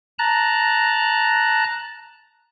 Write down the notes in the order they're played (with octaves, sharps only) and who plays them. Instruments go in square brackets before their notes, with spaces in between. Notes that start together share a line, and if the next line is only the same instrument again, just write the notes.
[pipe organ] A5 A#5 F#6